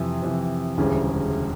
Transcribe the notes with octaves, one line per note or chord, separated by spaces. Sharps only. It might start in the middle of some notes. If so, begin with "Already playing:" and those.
Already playing: F2 C3 E3
F2 C3 E3
E1 D2 C#3 E3 G3